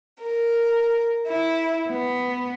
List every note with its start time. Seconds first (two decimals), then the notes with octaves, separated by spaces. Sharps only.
0.22 A#4
1.27 E4
1.88 B3